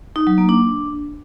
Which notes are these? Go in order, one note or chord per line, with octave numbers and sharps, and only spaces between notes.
D#4
F#3
A#3
D4